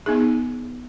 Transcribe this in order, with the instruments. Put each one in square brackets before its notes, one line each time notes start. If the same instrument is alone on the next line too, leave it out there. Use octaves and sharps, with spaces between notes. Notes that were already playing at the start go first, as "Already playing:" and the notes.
[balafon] B3 D#4 G#4